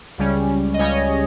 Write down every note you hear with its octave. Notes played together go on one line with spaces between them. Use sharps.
C#2 C#3 G3 C#4
D#5
C#2 C#3 G3 C#4 C#5